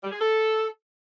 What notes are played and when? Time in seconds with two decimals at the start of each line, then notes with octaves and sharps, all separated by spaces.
0.02 G3
0.12 G#4
0.21 A4